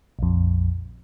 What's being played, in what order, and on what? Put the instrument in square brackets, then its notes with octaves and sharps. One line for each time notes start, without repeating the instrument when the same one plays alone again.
[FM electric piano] A#1 F2